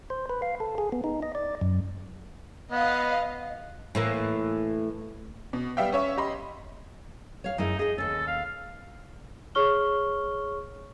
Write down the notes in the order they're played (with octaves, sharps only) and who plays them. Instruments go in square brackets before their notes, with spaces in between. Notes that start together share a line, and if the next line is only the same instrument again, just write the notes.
[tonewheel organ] C5
B4
F5
A4
G#4
B3
D#4
D#5
D5
F#2
[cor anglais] B3 [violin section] D#5 F5
[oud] A2 E3 A#3
[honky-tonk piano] B2
G3 B3 E5 F5 G5
C#4 C#5 E5
G4 D#5 B5 C6
[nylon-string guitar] C#5 F5
[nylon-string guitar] F#2 G#3 E4 [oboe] D#4
[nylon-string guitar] D#4 G#4 [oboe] D#5
[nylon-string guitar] D#2 C#4 [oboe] A4
[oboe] F5
[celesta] G#4 C#5 C#6 F6 G7